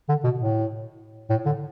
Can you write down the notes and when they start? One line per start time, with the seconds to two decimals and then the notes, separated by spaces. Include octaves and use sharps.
0.09 D3
0.24 B2
0.39 A2
1.30 A2
1.46 D3